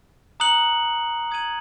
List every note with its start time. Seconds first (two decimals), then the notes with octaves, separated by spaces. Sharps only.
0.40 A#5 D#6 F#6 C#7 F#7
1.31 D#6 G#6 D#7 F#7